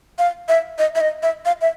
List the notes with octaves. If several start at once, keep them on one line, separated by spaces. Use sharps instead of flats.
F5
E5
D#5
E5
D#5
E5
F5
E5